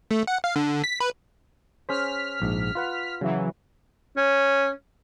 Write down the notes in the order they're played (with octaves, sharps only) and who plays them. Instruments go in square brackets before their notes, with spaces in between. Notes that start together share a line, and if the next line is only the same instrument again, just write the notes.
[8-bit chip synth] A3
F#5
F5
D3
B6
B4
[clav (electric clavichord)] C#4 G#4 C5 [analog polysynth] F6 B6
[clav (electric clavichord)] A#1 G#2
F4 B4 F#5
[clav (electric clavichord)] C#3 [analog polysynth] E3 F#3
[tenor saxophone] C#4